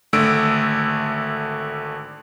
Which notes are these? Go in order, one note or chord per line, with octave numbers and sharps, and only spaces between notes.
G#1 D3 A3 E6 D7